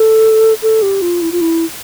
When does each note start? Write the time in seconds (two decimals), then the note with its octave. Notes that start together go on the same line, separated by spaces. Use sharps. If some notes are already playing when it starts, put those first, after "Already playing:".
Already playing: A4
0.62 A4
0.82 G4
1.02 F4
1.22 E4
1.32 F4
1.41 E4